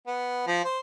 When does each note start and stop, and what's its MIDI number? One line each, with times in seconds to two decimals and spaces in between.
0.07 0.44 59
0.47 0.60 53
0.64 0.79 72